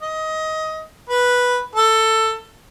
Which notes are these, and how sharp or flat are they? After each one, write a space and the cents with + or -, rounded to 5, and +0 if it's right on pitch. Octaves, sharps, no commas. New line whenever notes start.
D#5 +20
B4 -5
A4 +15